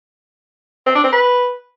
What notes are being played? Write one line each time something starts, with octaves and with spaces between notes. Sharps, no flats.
C4
D4
C4
B4